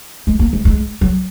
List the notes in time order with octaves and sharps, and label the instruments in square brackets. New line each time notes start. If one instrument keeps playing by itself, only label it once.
[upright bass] G#3
A#3
G#3
G#3
F#3